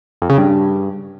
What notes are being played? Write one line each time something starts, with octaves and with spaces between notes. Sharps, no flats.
F2
C#3
G2